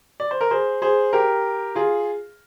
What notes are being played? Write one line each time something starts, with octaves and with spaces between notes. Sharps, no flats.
D5
C5
A#4
G#4 C5
G#4 C5
G4 A#4
F4 G#4